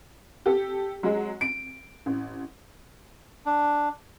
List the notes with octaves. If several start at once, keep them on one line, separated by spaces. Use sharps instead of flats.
G4 A4
F#3 G#3
D7
A1
D4